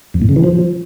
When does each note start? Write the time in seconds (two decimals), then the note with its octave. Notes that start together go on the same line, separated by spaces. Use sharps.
0.14 F2
0.22 A2
0.29 C#3
0.36 E3
0.44 F3